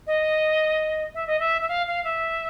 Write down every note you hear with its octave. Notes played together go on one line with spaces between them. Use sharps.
D#5
E5
D#5
E5
E5
F5
F5
E5